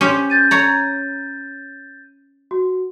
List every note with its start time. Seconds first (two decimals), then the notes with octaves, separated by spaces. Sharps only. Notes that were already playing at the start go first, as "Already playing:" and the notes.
0.01 C#4 G4 C5
0.30 G6 A6 D#7
0.51 C#5 A#5
2.51 F#4